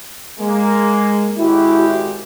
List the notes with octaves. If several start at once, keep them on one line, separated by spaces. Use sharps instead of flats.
G#3 A#3
G#1 G#3 E4 F#4 G4